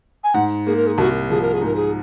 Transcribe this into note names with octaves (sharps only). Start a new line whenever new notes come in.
G#5
G#2 F#5
A#3 G#4
A#4
G#4
C2 F#4
F3 G#4
A#4
G#4
G#2 A#4
G#4